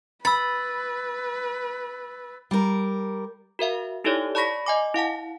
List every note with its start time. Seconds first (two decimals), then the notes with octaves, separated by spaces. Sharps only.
0.25 B4 B5 E6 A6
2.51 G3 A#4
3.59 F#4 A#4 E5 F5
4.04 D#4 E4 G4 A4 C#5 D5
4.35 D5 A5 B5 C#6 A#6 B6
4.66 D#5 G#5 D6
4.94 E4 F5 F#5 A5